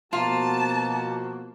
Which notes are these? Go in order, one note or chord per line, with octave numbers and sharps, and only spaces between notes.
B2 F3 A#3 F4 F#4 A5